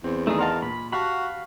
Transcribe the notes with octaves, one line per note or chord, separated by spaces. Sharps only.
E2 C4
D#3 A3 D#4 G#4 D5
A#4 D#5 F5 F#5 A5 C6
A#2 B5
F#4 G4 F5 F#5 A5 B5